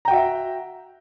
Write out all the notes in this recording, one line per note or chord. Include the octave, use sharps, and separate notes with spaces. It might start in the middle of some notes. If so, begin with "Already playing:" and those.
F#4 E5 G5 A#5